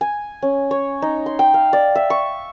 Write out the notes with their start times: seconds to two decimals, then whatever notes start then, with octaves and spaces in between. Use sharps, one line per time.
0.01 G#5
0.42 C#4
0.71 C#5
1.02 D#4
1.26 C6
1.39 G5
1.54 F5
1.73 D5
1.95 E5
2.10 C#6